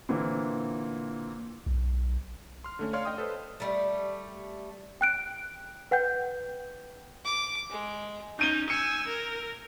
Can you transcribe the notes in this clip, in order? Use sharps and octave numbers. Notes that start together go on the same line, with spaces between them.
A#2 D3 E3 A#3 C4
B1
C6 F6
D3 A3 C#4
C#5 D5 F5 C6 F6
D#5 G5 D#6
A4 B4 C5
G3 A3
G5 F#6 D7
B4 F#5 G5 G6
D6
G#3
C#4 D#4 G6 D#7 G7
G#5 E6 C#7
A#4